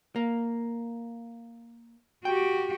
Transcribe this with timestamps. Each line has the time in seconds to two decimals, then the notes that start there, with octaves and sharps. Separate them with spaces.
0.16 A#3
2.25 F#4 G4 G5